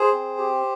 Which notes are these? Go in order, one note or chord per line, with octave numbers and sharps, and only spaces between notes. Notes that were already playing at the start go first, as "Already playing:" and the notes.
Already playing: G#4 C5
C4
G4